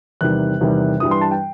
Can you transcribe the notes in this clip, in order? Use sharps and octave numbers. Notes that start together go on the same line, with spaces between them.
E2 C3 D#3 G3 F#6
E2 C3 D#3 G3
G2 E3 G3 D#6
C6
A5
G5